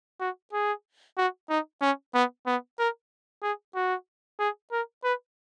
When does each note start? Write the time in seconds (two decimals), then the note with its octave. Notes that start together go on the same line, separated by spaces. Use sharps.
0.20 F#4
0.53 G#4
1.17 F#4
1.49 D#4
1.81 C#4
2.14 B3
2.46 B3
2.79 A#4
3.42 G#4
3.75 F#4
4.39 G#4
4.72 A#4
5.04 B4